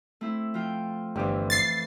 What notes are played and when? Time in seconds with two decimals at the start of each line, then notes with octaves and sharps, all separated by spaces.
0.21 A3 C4 E4
0.54 F3 F4 G5
1.16 G1 F2 E3 C4 G4
1.50 A6 C7